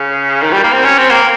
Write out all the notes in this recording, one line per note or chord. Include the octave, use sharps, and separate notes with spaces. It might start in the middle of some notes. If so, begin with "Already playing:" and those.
Already playing: C#3
D#3
G3
A#3
C4
C#4
C4
A#3